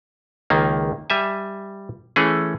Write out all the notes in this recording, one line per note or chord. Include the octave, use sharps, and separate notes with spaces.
C#2 D#3 A#3
G3 E5 G#5
E3 A3 C#4 G#4